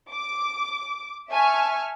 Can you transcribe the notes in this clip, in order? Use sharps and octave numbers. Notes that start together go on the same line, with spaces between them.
D6
E5 G#5 A5 C#6 F6